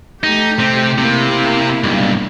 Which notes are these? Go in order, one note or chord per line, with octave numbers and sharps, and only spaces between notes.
A3 D#4 G4
C3 C4
C3 A#3 E4
B1 G2